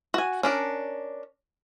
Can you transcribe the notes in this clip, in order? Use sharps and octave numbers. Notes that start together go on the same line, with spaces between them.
F#4 G#5
C#4 D4 A#4